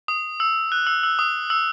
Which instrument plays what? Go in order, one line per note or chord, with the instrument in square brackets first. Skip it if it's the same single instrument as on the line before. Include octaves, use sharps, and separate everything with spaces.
[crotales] D#6
E6
F#6
E6
E6
D#6
E6